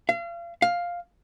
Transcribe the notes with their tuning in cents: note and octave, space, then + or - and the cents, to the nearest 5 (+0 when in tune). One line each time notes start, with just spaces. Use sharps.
F5 -35
F5 +5